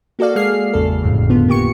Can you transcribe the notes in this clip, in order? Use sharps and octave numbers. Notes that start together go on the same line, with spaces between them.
A#3 F#4 A4 D5 F5
G#3 A#3 G#4 F6 C7
G#1 E2 C#3 A4
G1 F2 A2 C#3
D3 B3 F4
A#3 G4 C#6 C#7